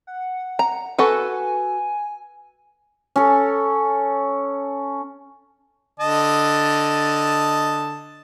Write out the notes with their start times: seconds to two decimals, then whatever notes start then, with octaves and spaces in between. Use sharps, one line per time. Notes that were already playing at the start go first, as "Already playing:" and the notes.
0.07 F#5
0.59 A#5
0.98 F#4 A4 B4 G#5
3.16 C#4 A4
6.00 D3 D#5 A5